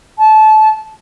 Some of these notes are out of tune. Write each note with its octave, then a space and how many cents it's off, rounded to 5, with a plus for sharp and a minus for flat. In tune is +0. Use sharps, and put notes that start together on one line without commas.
A5 -25